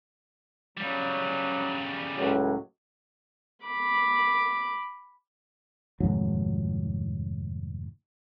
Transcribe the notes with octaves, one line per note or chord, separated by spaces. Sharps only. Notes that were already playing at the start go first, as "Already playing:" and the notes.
C#3 F#3 G3
C#2 A2 F#3
B5 D6
F1 D#2 G#2 F#3